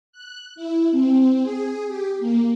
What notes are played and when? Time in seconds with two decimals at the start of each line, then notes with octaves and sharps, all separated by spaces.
0.12 F#6
0.56 E4
0.91 C4
1.43 G#4
1.88 G4
2.19 A#3